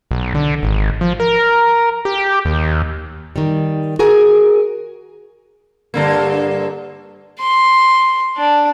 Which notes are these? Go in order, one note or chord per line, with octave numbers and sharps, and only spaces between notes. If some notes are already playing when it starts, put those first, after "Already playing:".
B1
D3
G#1
F3
A#4
G4
D#2
D#3 G3
F#4 G#4 A#4 G#5
G2 D3 A#3
C6
D4